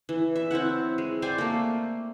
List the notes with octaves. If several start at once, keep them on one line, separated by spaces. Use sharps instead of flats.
E3
E5
C4 E4 C#5 F#5
G#3
C5 D5 G5 G#5
A3 A#3